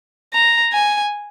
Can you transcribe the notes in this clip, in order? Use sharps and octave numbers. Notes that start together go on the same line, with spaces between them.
A#5
G#5